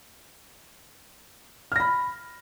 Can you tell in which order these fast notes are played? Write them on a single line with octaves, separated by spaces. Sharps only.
F6 A#6 B5